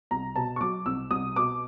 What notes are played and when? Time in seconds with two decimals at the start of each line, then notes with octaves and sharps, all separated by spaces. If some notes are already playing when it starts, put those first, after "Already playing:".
0.11 C2 A#5
0.36 B2 A5
0.56 C#6
0.61 F#3 D6
0.86 C2 E6
1.11 C2 D#6
1.36 B2 D6